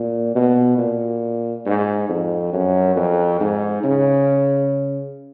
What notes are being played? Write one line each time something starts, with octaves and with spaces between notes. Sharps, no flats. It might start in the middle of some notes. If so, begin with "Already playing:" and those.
Already playing: A#2
B2
A#2
G#2
F2
F#2
F2
G#2
C#3